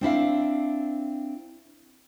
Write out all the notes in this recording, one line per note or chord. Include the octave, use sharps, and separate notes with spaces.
C4 D4 E4 F5